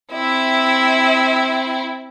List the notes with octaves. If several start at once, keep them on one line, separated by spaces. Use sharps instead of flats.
C4 E4 E5